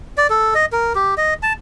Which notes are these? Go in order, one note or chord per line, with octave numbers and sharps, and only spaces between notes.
D5
A4
D#5
A#4
G4
D#5
A5